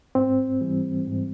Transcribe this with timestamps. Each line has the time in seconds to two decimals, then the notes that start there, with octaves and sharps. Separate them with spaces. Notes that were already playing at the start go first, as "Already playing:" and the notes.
0.15 G#2 C4
0.61 E3 G3
1.07 G#2